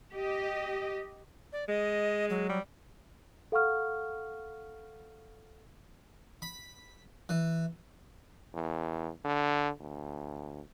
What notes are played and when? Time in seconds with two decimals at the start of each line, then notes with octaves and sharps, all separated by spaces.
0.13 G4 D#5
1.53 D5
1.68 G#3 D#5
2.30 F#3
2.49 G3
3.52 A4 F5 F#5 C#6 F6
6.42 B5
7.29 E3
8.54 E2
9.24 D3
9.80 D2